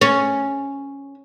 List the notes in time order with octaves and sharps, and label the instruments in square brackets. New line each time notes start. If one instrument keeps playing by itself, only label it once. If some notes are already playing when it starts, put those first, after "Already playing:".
[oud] C#4